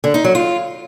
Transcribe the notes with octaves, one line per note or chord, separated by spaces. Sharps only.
D3
D#4
F#3
F4